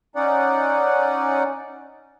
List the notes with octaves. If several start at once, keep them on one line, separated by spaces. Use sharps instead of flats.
C#4 D#4 D5 F#5